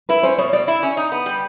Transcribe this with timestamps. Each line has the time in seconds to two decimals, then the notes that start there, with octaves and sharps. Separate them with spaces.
0.09 E4 B4
0.23 C#4 C5
0.38 B2 C#5
0.53 B2 D5
0.68 E4
0.83 C#4
0.97 D#4
1.12 B3
1.26 G3